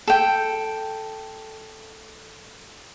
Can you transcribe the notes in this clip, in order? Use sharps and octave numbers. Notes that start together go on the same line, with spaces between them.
A4 G5